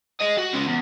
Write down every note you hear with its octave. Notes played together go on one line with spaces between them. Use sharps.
G#4 D#5
F#4
G#3 C#4
E2